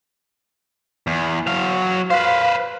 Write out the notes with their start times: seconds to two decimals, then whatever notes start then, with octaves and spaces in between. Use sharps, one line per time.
1.07 E2
1.47 F#3 F5
2.10 B4 C5 F5